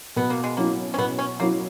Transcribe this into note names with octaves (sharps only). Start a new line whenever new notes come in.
B2 B3
A#3
G#3
F#3 A#3 C#4 E4
C#4
B2 B3
C#4
F#3 A#3 C#4 E4